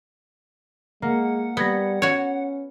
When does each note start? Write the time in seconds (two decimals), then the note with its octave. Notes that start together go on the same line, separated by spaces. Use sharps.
1.02 G#3 A#3 F#5
1.57 G3 B3 B4 G#6 A#6
2.02 C#4 F#4 C#5